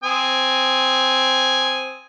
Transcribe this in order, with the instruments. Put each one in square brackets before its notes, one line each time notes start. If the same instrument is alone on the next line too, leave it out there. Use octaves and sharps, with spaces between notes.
[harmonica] C4 G#5 D#6